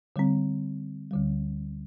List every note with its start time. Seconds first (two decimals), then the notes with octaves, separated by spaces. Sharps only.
0.16 D3 G3 C4
1.11 D2 D3 G3